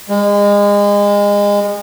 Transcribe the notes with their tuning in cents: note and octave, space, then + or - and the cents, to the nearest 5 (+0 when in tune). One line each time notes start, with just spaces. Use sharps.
G#3 -30